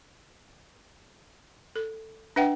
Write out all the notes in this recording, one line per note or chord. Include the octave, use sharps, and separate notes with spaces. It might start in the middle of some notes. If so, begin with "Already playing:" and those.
A4
D4 B4 E5 F#5 G5